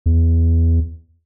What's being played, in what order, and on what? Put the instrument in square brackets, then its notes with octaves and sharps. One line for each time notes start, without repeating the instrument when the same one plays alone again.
[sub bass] E2